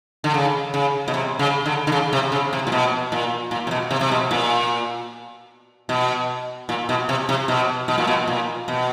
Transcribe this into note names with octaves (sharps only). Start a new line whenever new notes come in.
D3
C#3
C#3
B2
C3
C#3
D3
D3
C#3
C3
C#3
C3
A#2
B2
A#2
A#2
C3
B2
C3
C3
B2
A#2
B2
A#2
B2
C3
C3
B2
B2
A#2
B2
A#2
B2